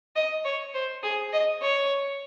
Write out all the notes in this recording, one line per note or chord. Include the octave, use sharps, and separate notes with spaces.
D#5
C#5
C5
G#4
D#5
C#5